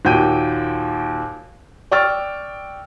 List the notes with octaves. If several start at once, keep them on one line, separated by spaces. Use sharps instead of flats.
D#2 A#2 F#4 G5 G6 D#7
D5 G5 C#6 E6 F6 A6